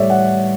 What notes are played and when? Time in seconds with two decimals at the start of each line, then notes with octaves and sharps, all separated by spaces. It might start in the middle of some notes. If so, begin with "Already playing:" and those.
Already playing: A2 G3 C#5 D5 E5
0.10 F#5